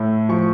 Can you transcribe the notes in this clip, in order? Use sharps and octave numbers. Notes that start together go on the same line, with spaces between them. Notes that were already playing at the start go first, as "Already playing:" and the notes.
Already playing: A2 A3
F3 C#6